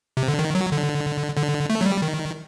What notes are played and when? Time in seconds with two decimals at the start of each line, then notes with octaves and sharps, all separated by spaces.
0.17 C3
0.28 D3
0.39 D#3
0.55 F#3
0.72 D3
1.37 D3
1.70 A3
1.81 F#3
1.86 G3
2.02 D#3